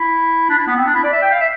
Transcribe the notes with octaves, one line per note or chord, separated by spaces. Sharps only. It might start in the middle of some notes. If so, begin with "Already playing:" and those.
Already playing: E4
D4
E4
B3
C4
D4
E4
D5
E5
G5
F5
E5